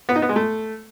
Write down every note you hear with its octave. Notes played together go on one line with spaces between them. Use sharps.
B3
D#4
B3
G#3
A3